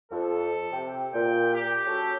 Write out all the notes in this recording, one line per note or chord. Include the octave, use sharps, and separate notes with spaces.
F2 A4
C3 G5
A#2 G5
G4
F#3 C#4 A4